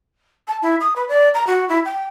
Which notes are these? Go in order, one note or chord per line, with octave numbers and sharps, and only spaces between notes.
A5
E4
D#6
B4
D5
A#5
F#4
E4
G5